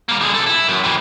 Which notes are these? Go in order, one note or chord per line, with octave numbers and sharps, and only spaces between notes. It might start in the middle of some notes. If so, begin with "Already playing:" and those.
G3 A#3
D3 G#4
B1 A4
E4
F#2
C3 E3